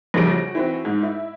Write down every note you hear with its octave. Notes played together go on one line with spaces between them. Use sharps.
A#1 F2 C#3 G3 A#6 D7
F#4
E3 C4 F#4
G#2
E4